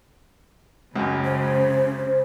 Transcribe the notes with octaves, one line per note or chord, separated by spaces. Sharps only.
C#2 F#2 C#3
C5